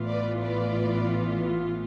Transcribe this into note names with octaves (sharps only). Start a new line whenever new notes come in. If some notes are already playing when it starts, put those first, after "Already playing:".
Already playing: A1 A2 E3 B3 F4
B4 D5
B4 D5